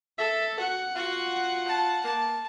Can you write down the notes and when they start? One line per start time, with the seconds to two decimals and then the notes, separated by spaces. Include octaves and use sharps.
0.19 A4 E5
0.60 F#4 F#5
0.96 F4 F#4
1.67 A5
2.04 A#3 A5